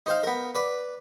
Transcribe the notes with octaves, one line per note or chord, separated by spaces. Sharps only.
D#4 C5 F5
B3 A#4
B4 D5